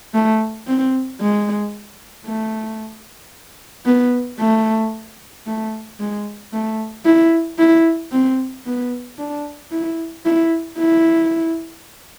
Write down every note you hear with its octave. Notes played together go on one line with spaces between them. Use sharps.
A3
C4
G#3
A3
B3
A3
A3
G#3
A3
E4
E4
C4
B3
D4
E4
E4
E4